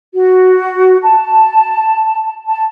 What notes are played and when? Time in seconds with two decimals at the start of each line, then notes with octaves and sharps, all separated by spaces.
0.12 F#4
1.02 A5
2.47 A5